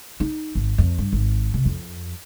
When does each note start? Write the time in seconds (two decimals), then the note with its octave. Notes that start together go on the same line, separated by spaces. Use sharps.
0.20 D#4
0.55 G#1
0.78 F2
0.98 G2
1.12 G#1
1.54 C3
1.65 F2